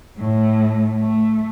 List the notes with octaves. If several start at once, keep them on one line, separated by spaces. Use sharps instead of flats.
A2
A3